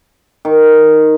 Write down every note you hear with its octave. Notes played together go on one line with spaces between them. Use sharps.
D#3